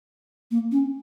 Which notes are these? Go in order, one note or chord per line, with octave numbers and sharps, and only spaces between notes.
A#3
C#4